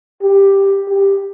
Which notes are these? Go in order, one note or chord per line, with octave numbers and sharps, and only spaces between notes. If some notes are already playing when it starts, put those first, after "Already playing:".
G4
G4